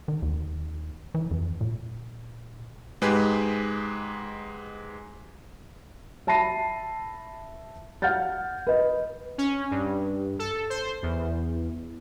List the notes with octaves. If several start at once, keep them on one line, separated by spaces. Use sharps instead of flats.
D#3
D#2
E3
F2
A#2
G#2 G#3 G4 G#4 B4
E5 A5 B5 A#6 C7 D#7
F5 F#5 F6 G6 A6
B4 D#5
C#4
G2
A4
C5
E2